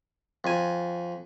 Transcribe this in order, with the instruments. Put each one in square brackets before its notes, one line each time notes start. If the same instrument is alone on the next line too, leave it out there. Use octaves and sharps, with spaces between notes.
[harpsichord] F2 G#5